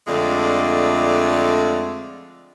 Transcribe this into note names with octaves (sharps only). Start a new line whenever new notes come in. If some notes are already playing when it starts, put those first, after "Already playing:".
F2 D3 G#3 A3 D5